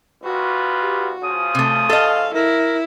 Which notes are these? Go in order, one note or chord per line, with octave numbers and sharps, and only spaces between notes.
C2 F4 F#4 B4
G4
C#3 F3 D#6
C3 A3
A4 D#5 F5
E4 A#4